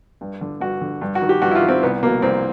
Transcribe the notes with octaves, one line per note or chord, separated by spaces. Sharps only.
G2
D3
G2 F#4
D3
G2
F#4
D#3
G4
G2 F#4
E4
F4
D#3
C4
C2 B3
B2 A#3
C2 C4